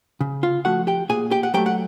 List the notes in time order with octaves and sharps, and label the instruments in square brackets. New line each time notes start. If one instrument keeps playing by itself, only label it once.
[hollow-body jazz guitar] C#3
F4 F5
F3 A3 F#4 F#5
G4 G5
A#2 G#4 G#5
G4 G5
F#5
F#3 A3 G4 G5
F#5